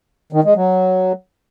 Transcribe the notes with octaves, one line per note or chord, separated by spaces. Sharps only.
D#3
G#3
F#3